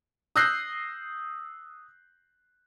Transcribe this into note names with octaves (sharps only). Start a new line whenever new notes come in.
D#6 E6 F#6 G6 A#6 C7